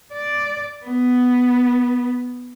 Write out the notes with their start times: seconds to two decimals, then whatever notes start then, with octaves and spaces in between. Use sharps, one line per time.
0.14 D5
0.85 B3